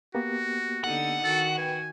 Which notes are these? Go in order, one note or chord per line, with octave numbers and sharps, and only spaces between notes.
A#3 B3 F#4 G4
D3 D#4 A4 F#5
D#3 F#4 A4
B4 G5 G#5